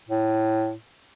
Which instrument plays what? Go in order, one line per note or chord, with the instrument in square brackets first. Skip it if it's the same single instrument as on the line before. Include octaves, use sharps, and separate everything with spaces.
[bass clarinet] A2